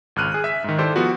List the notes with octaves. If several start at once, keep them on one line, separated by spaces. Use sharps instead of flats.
G#1 C#2 F6 F#6 D#7
G#4 F#6
E5 B6
G#2 D#3
E4 G4 A4 C5 D5
F3 B3 F4 F#4